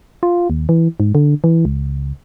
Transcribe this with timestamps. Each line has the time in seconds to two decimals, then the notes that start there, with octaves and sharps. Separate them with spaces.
0.23 F4
0.50 D#2
0.69 E3
1.00 G#2
1.15 D3
1.44 E3
1.65 C#2